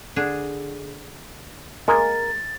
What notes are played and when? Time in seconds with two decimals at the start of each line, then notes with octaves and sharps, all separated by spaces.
0.16 D3 D4 G#4
1.88 G#3 A#3 A#4 A6